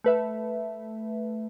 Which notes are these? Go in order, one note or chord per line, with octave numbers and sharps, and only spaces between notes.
A3 B4 E5